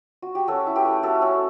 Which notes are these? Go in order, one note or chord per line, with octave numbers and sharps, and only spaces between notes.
F#4
G4
C#4 F#4 A4
E4
G4 B4
A3
A3 F#4 A4
C#4 F#4